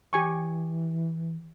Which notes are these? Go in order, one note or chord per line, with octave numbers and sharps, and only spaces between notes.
E3 G4 G#5 C#6